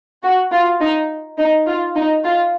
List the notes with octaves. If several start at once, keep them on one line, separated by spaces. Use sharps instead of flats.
F#4
F4
D#4
D#4
F4
D#4
F4